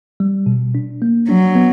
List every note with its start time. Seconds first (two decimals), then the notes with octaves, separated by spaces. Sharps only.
0.20 G3
0.46 B2
0.75 D4
1.02 A#3
1.29 F#3 D4
1.55 B3